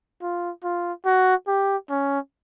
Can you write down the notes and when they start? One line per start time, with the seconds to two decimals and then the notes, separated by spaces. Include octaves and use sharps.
0.22 F4
0.63 F4
1.05 F#4
1.47 G4
1.90 C#4